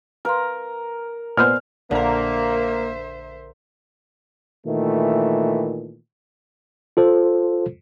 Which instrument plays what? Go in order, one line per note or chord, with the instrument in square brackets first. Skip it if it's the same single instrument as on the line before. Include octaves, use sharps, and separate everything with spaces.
[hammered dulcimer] A#4 [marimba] B4 F5 C6
[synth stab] A#2 B3 C5 [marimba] D5 G#5 C6 [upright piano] F6
[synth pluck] A#1 A#4 [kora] D3 F4 [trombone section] A#3 [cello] C5 E5
[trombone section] A#2 D#3 E3 A3
[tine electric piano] F4 A4 C5